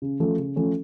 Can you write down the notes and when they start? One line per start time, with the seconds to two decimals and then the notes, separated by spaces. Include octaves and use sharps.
0.02 C#3
0.20 F3 A3 C#4
0.38 C#3
0.56 F3 A3 C#4